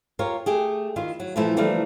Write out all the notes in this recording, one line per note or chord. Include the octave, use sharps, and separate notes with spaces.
F4 G4 A#4 C#5
A3 G4 G#4
D#3 E4 F4
F#3
A#2 E3 F3 A3 E4
D3 E3 F3 G3 A3 A#3